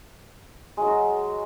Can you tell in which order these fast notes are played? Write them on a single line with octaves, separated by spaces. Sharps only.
G#3 F#3 F#4